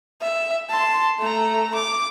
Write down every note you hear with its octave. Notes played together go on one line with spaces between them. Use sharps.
E5
A5 C6
A3 A#5
D6